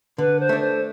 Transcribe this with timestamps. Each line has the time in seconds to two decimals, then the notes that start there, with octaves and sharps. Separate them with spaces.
0.18 D3 B4
0.39 C5
0.49 A3 D4
0.60 C5